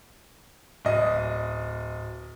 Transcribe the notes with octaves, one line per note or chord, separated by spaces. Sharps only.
D1 D#5